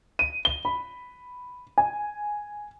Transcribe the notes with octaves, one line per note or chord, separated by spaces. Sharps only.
D#7
G7
B5
G#5